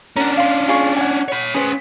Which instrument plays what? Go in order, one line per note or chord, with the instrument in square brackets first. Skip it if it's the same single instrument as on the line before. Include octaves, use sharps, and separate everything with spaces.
[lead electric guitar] C#4 D4 [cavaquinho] A#4 F#5
[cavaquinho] F5 C6
F4 G#4 C#6
F#5 G#5
[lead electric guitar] C#5 B5
[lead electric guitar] C#4 B4 [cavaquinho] G#4 C5